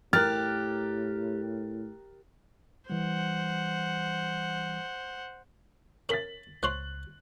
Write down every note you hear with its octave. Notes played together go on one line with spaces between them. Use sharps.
A2 G4 A#4 F6 F#6 A6
E3 G3 C5 F#5
C#4 A#4 A6 B6 F#7
C#2 C5 C#5 C6 F#6 F#7